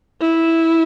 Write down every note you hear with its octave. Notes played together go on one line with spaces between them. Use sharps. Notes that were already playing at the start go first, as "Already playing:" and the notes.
E4